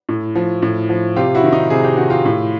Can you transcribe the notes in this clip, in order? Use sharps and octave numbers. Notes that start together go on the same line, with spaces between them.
A2
F3
A2
F3
C3 F4 G4
E4 F#4
D#3
D#4
C3 G#4
G4
D#3 F#4
F4 G4
A2